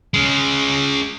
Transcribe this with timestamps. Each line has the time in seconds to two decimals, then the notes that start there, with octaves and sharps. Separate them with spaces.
0.14 G#3 C#4